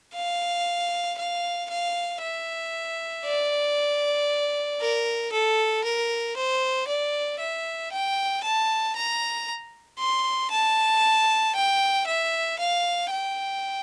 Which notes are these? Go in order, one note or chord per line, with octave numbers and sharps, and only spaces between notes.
F5
F5
F5
E5
D5
A#4
A4
A#4
C5
D5
E5
G5
A5
A#5
C6
A5
G5
E5
F5
G5